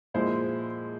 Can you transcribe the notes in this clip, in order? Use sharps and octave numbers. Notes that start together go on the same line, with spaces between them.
A#2 F3 G#3 E4 C5